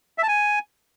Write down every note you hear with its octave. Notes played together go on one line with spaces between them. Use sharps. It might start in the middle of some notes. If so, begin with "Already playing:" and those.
E5
A5
G#5